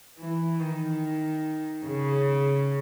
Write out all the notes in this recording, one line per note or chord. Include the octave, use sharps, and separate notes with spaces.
E3
D#3
C#3